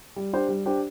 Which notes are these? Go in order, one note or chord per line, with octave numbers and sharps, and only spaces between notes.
G3
D4 G4 C5
G3
D4 G4 C5